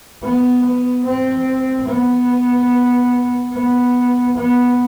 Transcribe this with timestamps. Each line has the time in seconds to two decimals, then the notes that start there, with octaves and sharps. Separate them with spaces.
0.22 B3
0.64 B3
1.05 C4
1.88 B3
3.53 B3
4.37 B3